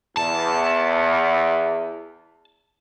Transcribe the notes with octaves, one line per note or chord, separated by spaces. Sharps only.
E2 A5